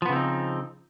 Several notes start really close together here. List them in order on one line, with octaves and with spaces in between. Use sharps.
F3 B3 C#3 C4 D#4